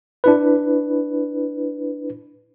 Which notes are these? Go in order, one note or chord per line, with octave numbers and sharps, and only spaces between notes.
D4 E4 B4